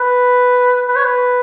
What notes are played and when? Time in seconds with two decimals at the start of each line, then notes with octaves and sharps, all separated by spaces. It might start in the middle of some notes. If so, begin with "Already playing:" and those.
Already playing: B4
0.88 B4
0.96 C#5
1.04 B4